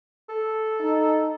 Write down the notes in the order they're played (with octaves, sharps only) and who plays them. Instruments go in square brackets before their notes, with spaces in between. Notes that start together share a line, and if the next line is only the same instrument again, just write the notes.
[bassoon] A4
[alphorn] D#4